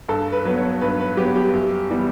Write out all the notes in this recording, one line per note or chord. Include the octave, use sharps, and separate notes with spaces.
G2 A4
B4
F#3 B3 B4
C#5
G2 B4
B4
F#3 B3 G4
G4
F#2
E3 G3 B3